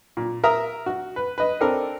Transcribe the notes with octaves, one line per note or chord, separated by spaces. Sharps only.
A#2
A#4 E5 A#5 D#6
F#4
B4
B4 D#5
C4 D4 A4 A#4